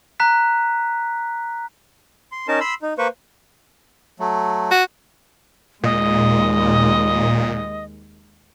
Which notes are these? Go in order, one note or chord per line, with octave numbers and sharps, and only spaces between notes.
A#5 F#6 B6
C6
C#4 D#4 A#4 A5
B5 C6 E6
D#4
A#3 B4 C5 C#6
F#3 A3
F#4
D#2 A#2 G#3 D#5